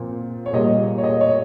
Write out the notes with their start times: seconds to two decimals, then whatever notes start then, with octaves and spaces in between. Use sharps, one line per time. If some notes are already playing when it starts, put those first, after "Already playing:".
Already playing: A#2 F3 C4
0.46 C#5
0.53 A#2 G3 A#3 D#5
0.98 C#5
1.04 D#5
1.21 C#5